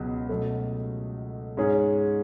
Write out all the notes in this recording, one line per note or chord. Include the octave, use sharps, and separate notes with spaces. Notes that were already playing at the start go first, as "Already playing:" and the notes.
Already playing: C#2 B2 F#3 B3
B2 F#3 A3
G#2 G#3 C#4 G#4